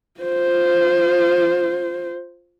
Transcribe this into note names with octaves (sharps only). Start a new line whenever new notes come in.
F4 C5